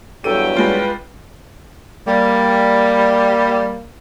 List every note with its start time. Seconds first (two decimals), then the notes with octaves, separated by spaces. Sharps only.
0.24 E2 G2 F#3 G4 A4 G5 D#7
0.56 G3 G#3 F4 B4
2.07 G3 A#3